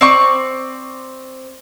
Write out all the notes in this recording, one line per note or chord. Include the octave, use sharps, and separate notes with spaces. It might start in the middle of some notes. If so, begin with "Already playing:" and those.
C4 D5 C#6